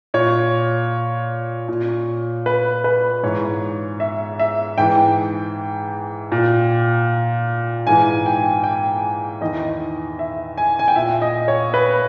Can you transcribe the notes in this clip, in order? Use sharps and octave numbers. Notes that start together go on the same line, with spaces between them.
A#2 C#5
A#2
B4
B4
G#2 E3 C#5
E5
E5
G#2 E3 G5
A#2
G#2 E3 G#5
G5
G5
E2 D#3 D#5
E5
G#5
G#5
G5
A#2 E5
D#5
C#5
B4